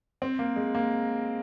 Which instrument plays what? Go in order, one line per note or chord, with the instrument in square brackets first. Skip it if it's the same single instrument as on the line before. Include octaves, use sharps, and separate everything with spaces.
[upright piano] C4
A#3
G#3
A#3